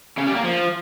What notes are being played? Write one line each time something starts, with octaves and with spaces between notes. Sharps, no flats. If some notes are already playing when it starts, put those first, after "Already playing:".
C#3
G3
A#3
F3